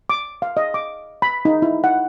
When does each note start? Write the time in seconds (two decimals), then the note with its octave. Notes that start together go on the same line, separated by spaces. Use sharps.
0.10 D6
0.42 F5
0.57 D#5
0.74 D6
1.22 B5
1.45 D#4
1.62 E4
1.84 F#5